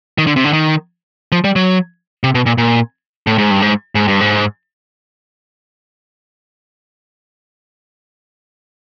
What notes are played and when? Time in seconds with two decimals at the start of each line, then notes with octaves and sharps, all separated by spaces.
0.18 D#3
0.27 D3
0.36 C3
0.45 D3
0.53 D#3
1.32 F3
1.44 G3
1.56 F#3
2.24 C3
2.35 B2
2.46 A#2
2.58 A#2
3.27 A2
3.38 G#2
3.51 G2
3.62 G#2
3.95 G#2
4.08 G2
4.21 G#2